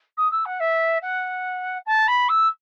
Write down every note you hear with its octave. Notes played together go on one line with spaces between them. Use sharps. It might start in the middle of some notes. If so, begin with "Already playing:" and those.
D#6
E6
F#5
E5
F#5
A5
B5
E6